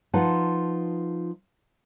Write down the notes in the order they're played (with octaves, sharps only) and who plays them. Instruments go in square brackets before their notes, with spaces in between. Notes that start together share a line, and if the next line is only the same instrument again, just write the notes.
[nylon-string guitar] F3 D#4 F4 B4 F#5 A5